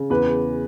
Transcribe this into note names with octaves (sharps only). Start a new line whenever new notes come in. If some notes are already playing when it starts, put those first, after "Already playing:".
Already playing: C#3
E2 B4